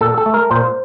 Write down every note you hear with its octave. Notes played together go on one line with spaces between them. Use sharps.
A#2 A4
A4
A3
A#4
A#2 C5